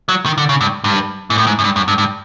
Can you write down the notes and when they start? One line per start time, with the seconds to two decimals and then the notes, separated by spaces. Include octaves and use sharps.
0.09 F#3
0.26 D#3
0.38 D3
0.49 C#3
0.61 G2
0.84 G2
1.30 G#2
1.38 A2
1.47 G#2
1.59 F#2
1.64 G2
1.76 F#2
1.88 G2
1.98 G2